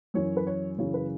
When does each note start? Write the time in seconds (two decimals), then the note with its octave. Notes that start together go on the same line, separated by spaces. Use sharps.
0.14 F#2 E3 C#5
0.37 B4
0.47 C#5
0.78 F#2 C#3 E3 C#5
0.94 B4